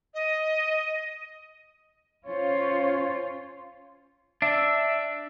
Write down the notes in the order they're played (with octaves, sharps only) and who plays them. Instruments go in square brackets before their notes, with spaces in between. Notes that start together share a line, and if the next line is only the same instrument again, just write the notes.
[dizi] D#5
[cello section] C#4 F4 C5 C#5
[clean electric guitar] D4 [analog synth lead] E5